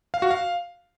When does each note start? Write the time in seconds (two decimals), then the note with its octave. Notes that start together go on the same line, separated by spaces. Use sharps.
0.14 F5
0.22 F#4
0.31 F5